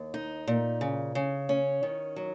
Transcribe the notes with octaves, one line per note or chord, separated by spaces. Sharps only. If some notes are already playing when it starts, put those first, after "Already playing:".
Already playing: D#2
D#4
A#2
C#3
C#3
C#4
D#3
F#3